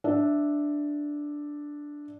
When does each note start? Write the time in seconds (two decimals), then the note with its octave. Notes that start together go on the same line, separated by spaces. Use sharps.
0.04 D4 E5